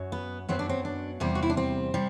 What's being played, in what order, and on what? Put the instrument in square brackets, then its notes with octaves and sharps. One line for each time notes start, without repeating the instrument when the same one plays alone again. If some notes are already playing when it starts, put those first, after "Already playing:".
Already playing: [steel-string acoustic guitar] F#2 F#3
B3
F#2 F#3 B3 C4
D4
C4
D4
E2 C3 G3 C4
F#4
E4
D4
C4
C3 G3